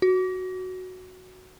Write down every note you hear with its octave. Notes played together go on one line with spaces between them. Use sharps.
F#4